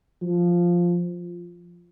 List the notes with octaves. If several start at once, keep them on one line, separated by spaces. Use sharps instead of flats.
F3